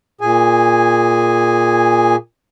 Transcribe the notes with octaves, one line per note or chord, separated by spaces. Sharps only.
A#2 G#4 G#5